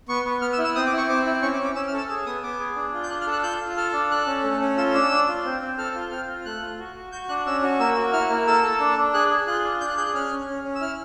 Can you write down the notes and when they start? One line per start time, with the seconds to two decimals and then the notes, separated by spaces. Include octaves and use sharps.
0.09 B3 C#6
0.25 B3
0.41 B3 F6
0.53 E6
0.58 E4
0.65 E6
0.75 C4 D#6
0.87 D6
0.92 E4
0.98 C#6
1.09 C4 D6
1.26 E4
1.42 C#4 C#6
1.53 D6
1.59 C#4
1.64 D6
1.75 C#4 E6
1.88 F6
1.93 A4 E6
2.09 G#4 E6
2.26 B3 D#6
2.43 B3 D6
2.60 G#4
2.76 D4
2.94 F4
3.03 G6
3.10 D4 F#6
3.21 F6
3.27 A4
3.32 F#6
3.43 F4 G6
3.61 F4
3.76 A4 F6
3.93 D4
4.11 A4 F#6
4.27 C#4
4.44 A3
4.61 C#4
4.78 F4 E6
4.94 D4 E6
5.11 D4
5.28 F4
5.45 C4
5.62 C4
5.78 A4 F6
5.95 F4
6.11 C4 F6
6.28 F4
6.45 A3 F#6
6.62 F4
6.79 F#4
6.95 F#4
7.12 F#4 G6
7.29 D4 F#6
7.46 C#4 E6
7.63 F#4
7.80 A#3 E6
7.97 F#4
8.13 E4 F6
8.30 A#3
8.47 A4 E6
8.63 A4
8.80 D4
8.97 D4
9.13 G#4 F#6
9.30 G#4
9.47 F4 F#6
9.64 D4
9.81 D4 G6
9.89 F#6
9.97 G#4 G6
10.06 F#6
10.14 C#4 F6
10.31 C#4
10.48 C#4
10.64 C#4
10.75 E6
10.81 E4 F6